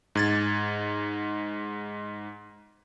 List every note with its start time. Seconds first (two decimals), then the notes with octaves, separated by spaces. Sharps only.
0.15 G#2 G#6 A6